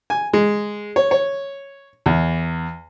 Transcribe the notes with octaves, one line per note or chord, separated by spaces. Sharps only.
G#5
G#3
C#5
C#5
E2